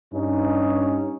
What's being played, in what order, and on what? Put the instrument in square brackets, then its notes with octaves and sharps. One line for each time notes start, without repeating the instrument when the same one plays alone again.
[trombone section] G2 C#4 D#4